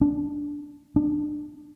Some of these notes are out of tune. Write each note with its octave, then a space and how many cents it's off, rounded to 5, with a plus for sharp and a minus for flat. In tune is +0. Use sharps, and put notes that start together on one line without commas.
D4 -10
D4 +20